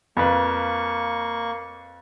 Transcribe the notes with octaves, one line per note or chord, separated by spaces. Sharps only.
F2 A#3 B4 C#6